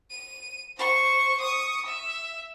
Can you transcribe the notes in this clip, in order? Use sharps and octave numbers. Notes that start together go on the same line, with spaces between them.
D#7
C5 C#6
C#6 D#6
E5